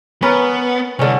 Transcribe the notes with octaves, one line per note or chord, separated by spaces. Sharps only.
B3 C#4 A#4 B4
C2 D3 C#4